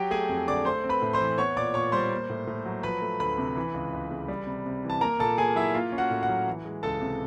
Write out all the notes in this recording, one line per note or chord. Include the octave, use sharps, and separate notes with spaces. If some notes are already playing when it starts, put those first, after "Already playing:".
Already playing: F#3 G4 G5
A3 G#4 G#5
F2
D3 D5 D6
A3 C5 C6
C4
B4 B5
A2
C5 C6
E3
B3 C#5 C#6
A#2 D5 D6
A#2 C#5 C#6
G3 C5 C6
A#3
A2
A2
F#3
F3 B4 B5
A3
D2 B4 B5
C3
E3
C#2
C#2
C#3
G3
C3
C3
E3
A5
A#3 A#4 A#5
A#2 A4 A5
A#2 G#4 G#5
F#3 E4 E5
A#3 F4 F5
C#4
F#4 F#5
A2
F#4 F#5
F#3
E3
G#3
C#2 A4 A5
C3